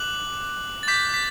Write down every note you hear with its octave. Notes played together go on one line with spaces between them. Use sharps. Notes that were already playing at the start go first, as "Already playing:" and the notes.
Already playing: D6 F#6 F#7
A6
D6 G6 B6
B6